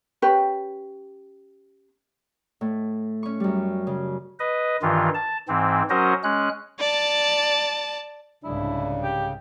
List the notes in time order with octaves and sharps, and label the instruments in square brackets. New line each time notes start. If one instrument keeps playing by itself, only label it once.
[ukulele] C#4 G4 B4
[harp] A2
C#4 C#6
F#2 G3
C#3
[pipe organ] B4 D#5
G2 D#3 E3 F4
A5
G#2 E3 C4
F#3 C#4 F#4 A#4 C5 D#5
G#3 C#4 F#6
[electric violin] D5 A5
[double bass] C2 G#2 [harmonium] C#3 [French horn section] D4 [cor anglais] E4
[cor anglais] G4